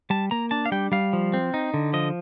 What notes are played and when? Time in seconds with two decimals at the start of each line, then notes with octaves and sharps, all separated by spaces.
0.10 G3 A5
0.31 A#3 A#5
0.51 D4 A5
0.66 F5
0.72 G3 G5
0.92 G3 F5
1.13 F3
1.33 C4
1.54 D#4
1.74 D3
1.93 F3 D#5